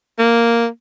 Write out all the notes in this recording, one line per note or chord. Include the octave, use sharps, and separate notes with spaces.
A#3